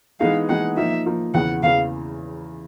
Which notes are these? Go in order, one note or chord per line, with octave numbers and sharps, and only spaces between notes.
E3 G#3 B3 D#4 G#4 F5
E3 G#3 B3 D#4 G#4 F#5
F3 A#3 D#4 E5
F3 A#3 D#4
E2 C#3 E3 F#5
E2 C#3 E3 F5